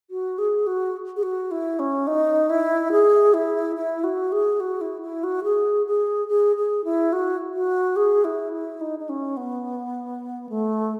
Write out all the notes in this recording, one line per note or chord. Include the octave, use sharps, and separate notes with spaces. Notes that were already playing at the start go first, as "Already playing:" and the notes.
F#4
G#4
F#4
G#4
F#4
E4
C#4
D#4
E4
G#4
E4
E4
F#4
G#4
F#4
E4
E4
F#4
G#4
G#4
G#4
G#4
E4
F#4
F#4
G#4
E4
E4
D#4
D#4
C#4
B3
A3